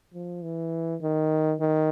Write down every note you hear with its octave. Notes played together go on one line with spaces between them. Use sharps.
F3
E3
D#3
D#3